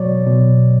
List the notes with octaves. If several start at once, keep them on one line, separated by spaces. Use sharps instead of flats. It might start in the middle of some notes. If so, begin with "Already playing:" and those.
Already playing: B2 F#3 C#5 D5
B2